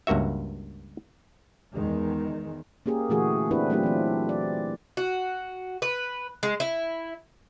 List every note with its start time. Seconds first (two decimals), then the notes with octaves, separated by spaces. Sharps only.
0.07 C#2 G2 A#3 F#4 E5
1.74 E2 D#3 G#3
2.86 A#3 C#4 G4 G#4 A#4
3.09 A#2 D3 E3 A3 F#4 G#4
3.51 C4 D4 E4 G4 G#4 B4
3.70 F#3 A3 C4 D4 F4 G4
3.83 E3 C4
4.29 D5
4.97 F#4
5.82 B4
6.43 G#3
6.60 E4